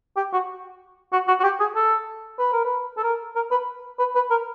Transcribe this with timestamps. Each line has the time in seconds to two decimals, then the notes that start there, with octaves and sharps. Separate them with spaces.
0.17 G4
0.33 F#4
1.13 F#4
1.28 F#4
1.40 F#4
1.44 G4
1.60 G#4
1.76 A4
2.39 B4
2.53 A#4
2.65 B4
2.97 A4
3.03 A#4
3.36 A#4
3.51 B4
3.99 B4
4.15 B4
4.31 A#4